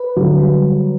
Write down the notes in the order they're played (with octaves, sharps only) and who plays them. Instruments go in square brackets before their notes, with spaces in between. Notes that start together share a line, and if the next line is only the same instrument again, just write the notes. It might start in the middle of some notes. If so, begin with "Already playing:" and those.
Already playing: [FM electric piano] B4
[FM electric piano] D3 [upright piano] F#3
[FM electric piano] G3